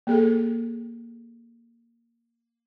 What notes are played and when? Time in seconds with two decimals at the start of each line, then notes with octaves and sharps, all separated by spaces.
0.07 A#3 G#4 A4